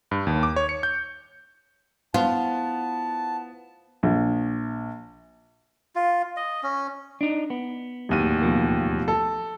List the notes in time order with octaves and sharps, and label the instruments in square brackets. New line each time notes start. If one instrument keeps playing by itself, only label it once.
[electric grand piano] G2
D#2
D6
C#5
C#7
G6
[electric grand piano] B3 [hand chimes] E4 C5 F#5 [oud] F4 [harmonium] A5
[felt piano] A#1
[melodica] F4
D#5
C#4
[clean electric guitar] D4 D#4
B3
[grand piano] D1 D#2 D#7
[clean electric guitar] B2 F3 A#3
[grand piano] A4